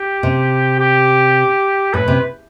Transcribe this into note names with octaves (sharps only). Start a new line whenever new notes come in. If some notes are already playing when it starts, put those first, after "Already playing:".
Already playing: G4
C3
G4
A2 B4
C3